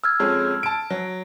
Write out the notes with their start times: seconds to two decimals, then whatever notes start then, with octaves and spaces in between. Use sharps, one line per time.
0.04 E6 F6 G#6
0.20 F2 G#3 C#4
0.63 A5 D7
0.90 F#3